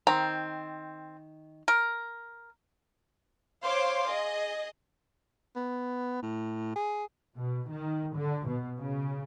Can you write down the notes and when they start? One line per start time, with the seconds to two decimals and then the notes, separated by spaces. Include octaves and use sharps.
0.07 D#3 C4 A#5
1.68 A#4
3.63 C5 C#5 F5 C6 D6
4.08 G#4 D#5
5.56 B3
6.22 A2
6.76 G#4
7.37 B2
7.69 D#3
8.15 D3
8.47 B2
8.78 C#3